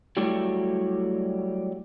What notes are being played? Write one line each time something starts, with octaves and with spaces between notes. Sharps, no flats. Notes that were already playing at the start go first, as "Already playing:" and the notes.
F#3 G3 A3 E4 F#4 G4